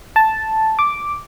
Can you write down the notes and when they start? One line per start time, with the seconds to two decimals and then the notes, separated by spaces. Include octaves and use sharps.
0.16 A5
0.79 D6